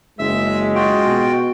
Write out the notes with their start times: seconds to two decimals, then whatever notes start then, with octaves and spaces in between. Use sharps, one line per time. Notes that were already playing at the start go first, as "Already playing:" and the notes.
0.19 F#1 G#3 E5 E6
0.75 F4 F#4 G5
1.06 B2